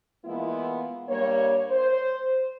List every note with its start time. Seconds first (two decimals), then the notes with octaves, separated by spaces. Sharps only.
0.25 E3 G#3 A#3 B3 E4 F4
1.09 G2 G3 A#3 C#5
1.69 C5